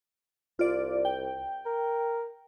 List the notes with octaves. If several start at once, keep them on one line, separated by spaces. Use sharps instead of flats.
C2 F4 D5
G5
A#4